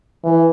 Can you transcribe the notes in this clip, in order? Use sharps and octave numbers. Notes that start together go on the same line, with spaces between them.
E3